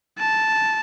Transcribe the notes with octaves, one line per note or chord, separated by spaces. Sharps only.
A5